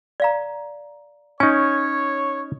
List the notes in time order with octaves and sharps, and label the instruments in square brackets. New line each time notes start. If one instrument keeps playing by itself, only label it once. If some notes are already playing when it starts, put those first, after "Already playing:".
[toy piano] D5 F5 A#5
[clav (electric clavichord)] C#4 D#4 [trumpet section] C#5 [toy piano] G#5